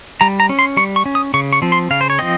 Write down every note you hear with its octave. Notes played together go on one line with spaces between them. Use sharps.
G3 A#5
A#5
C#4
C6
G3 C#6
C#6
C#4
D#6
C#3 C#6
C#6
F3 C4
C6
C#3 F5
C5
C#5
F3 C4 D#5